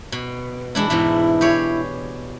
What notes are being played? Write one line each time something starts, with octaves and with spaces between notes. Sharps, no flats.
B2
E3 G#3 D4 E4
G#2 B2 E3 E4
G4 G#4 C#5